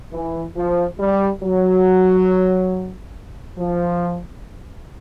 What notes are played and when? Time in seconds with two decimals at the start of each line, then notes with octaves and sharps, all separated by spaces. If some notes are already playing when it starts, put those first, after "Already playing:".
0.12 E3
0.56 F3
0.99 G3
1.42 F#3
3.57 F3